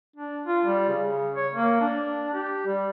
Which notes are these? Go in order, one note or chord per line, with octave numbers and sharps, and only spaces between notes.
D4
F4
G3
C#3
C#5
A#3
D4
G4
G3